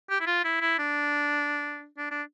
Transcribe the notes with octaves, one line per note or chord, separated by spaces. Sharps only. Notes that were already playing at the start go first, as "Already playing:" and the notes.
G4
E4
F4
E4
E4
D4
D4
D4